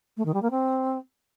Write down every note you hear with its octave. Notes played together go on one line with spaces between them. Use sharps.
A3
D#3
G3
A#3
C4